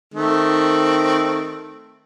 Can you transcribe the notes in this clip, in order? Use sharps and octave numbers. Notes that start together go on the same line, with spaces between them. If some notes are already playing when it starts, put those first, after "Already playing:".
D#3 A3 C4